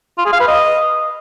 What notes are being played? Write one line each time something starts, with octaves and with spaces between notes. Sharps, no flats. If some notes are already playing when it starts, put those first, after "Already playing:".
F4
G#4
F5
B4
D#5